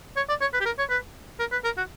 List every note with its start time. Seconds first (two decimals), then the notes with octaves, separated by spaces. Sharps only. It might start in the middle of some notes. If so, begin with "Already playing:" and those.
0.17 C#5
0.29 D5
0.41 C#5
0.53 B4
0.61 G4
0.66 A#4
0.79 C#5
0.90 B4
1.40 A#4
1.52 B4
1.65 A#4
1.77 F#4